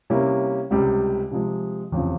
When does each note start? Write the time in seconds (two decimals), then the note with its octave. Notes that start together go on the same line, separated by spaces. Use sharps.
0.10 C3 G3 A#3 C#4 E4
0.71 C#2 C3 G3
1.31 C3 F3 G#3
1.91 F1 E2 C#3 F3 C4